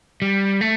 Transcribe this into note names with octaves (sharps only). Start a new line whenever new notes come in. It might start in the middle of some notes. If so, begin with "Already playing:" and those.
G3
A3